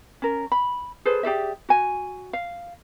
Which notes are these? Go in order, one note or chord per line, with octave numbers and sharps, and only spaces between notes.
C#4 A#4
B5
G#4 A4 B4 C5
G4 G#4 D5 E5
F#4 G#5
F5